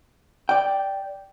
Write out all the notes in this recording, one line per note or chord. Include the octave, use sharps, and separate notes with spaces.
D5 G5